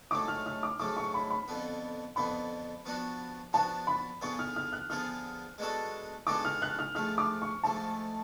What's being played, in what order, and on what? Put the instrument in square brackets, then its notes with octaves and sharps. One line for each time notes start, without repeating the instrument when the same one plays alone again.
[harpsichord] G#2 F#3 A3 [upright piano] D6
[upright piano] F6
F6
D6
[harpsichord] G#2 F#3 A3 [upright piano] D6
[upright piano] C#6
B5
B5
[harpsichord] F2 D3 F3 B3
[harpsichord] F2 D3 F3 B3 [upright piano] B5
[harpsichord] F3 B3 D4 F#4
[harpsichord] F3 B3 D4 F#4 [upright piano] A5
[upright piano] B5
[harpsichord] D3 F3 B3 F4 G#4 [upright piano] C#6
[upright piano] F6
F6
F#6
[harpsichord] D3 F3 B3 F4 G#4 [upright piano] F6
[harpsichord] G#3 B3 D4 F#4 A4
[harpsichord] G#3 B3 D4 F#4 A4 [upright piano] D6
[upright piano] F6
F#6
F6
[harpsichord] G#2 F3 A3 [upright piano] F6
[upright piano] D6
C#6
[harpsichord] G#2 F3 A3 [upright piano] A5